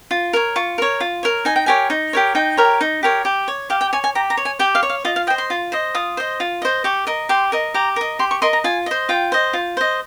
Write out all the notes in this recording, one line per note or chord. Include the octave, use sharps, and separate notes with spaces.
F4
A#4 C#5
F4 C#6
A#4 C#5
F4
A#4 C#5
D#4 G#5
G5
G4 A#4 C#5 G#5
D#4
G4 A#4 C#5
D#4 G5
G4 A#4 C#5
D#4
G4 A#4 C#5
G4
C#5
G4 F5
G5
C#5 G#5
G#5
G4 A#5
A#5
C#5
G#5
G4 G5
F5
C#5
F5
F4 D#5
F5
C5 D#5 G5
C6
F4
C5 D#5
F4 D#6
C5 D#5
F4
C5 D#5
G4 C#6
A#4 D#5
G4 C6
A#4 D#5
G4 A#5
A#4 D#5
G4 C6
C#6
A#4 D#5 C6
A#5
F4 G#5
C5 D#5
F4 G5
C5 D#5
F4
C5 D#5